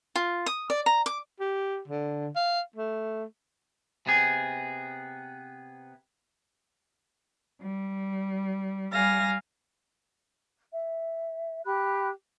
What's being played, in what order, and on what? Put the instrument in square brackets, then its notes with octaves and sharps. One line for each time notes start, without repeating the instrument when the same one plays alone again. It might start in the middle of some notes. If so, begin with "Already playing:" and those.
[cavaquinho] F4
D#6
D5
A#5
D6
[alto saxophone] G4
D3
F5
A3
[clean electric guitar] C3 B3 G#4
[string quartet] G3
G3 F5 G#5 A#6
[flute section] E5
G4 B5 F#6